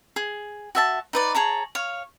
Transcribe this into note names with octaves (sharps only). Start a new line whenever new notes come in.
G#4
F#4 E5 A5
D#4 B4 D5
G#4 C#5 A5 A#5
C#5 F5